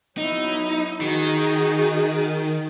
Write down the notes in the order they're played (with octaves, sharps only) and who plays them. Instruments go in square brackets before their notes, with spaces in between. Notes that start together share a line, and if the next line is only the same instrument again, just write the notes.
[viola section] F#3 B3 E4 [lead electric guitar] D#4
[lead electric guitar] D#3 [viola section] D#4 F#4 G#4